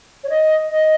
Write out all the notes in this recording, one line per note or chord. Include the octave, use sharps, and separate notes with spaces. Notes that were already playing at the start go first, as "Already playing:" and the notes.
C#5
D#5
D#5